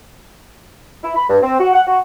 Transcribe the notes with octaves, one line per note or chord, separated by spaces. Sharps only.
E4
B5
G2
C4
F#4
F#5
F#4